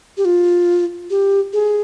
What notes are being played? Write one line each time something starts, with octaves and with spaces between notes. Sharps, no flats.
G4
F4
G4
G#4